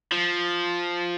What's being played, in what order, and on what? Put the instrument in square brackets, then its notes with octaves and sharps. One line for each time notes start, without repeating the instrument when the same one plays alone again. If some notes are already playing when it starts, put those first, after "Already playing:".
[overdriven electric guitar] F3